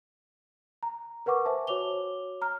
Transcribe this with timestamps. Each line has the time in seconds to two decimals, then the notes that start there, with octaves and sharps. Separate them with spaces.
0.83 A#5
1.26 A#4 B4 F#5 C#6 D6
1.45 C5 E5 G#5 A5
1.67 F#4 C#5 D6 F7 G7
2.42 A#5 F6